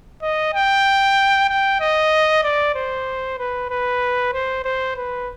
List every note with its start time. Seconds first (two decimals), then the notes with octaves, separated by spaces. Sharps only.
0.22 D#5
0.54 G5
1.49 G5
1.80 D#5
2.43 D5
2.75 C5
3.39 B4
3.70 B4
4.34 C5
4.65 C5
4.97 B4